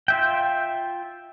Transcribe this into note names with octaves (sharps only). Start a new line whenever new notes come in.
F4 E5 G5